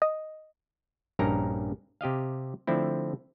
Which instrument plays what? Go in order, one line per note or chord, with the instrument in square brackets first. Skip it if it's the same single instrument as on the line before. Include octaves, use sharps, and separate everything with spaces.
[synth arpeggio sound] D#5
[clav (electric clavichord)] A#1 G2 C#4 D#4 A#4 A#5
C3 G4 D#5 F5
D3 F3 A3 C4 E4